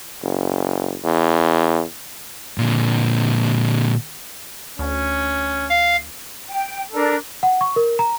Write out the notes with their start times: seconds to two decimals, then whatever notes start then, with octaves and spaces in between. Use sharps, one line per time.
0.22 F#1
1.04 E2
2.58 A#2 D3
4.79 D2 C#4
5.70 F5
6.49 G5
6.92 D4 A4 A#4
7.43 F#5
7.61 C#6
7.76 A#4
7.99 A#5